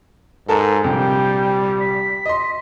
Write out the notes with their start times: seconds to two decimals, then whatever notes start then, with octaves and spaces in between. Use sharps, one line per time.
0.49 G#2 A4 A#4 A5
0.84 A#1 C3 G3 G5
1.80 B6
2.26 D#5 C6